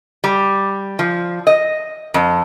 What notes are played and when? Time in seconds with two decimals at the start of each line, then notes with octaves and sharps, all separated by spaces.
0.24 G3
0.99 F3
1.47 D#5
2.14 F2